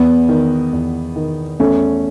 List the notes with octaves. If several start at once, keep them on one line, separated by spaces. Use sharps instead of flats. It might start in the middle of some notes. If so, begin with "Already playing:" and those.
Already playing: E2 B3
D#3
E2
D#3
E2 A3 C#4